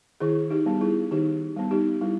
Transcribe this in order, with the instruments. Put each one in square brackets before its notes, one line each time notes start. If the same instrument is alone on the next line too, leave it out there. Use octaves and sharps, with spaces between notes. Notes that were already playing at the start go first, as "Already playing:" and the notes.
[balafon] D#3 E4 G#4
D#4 G4
G3 B3
E4 G#4
D#3 D#4 G4
G3 B3
D#4 G4
G3 E4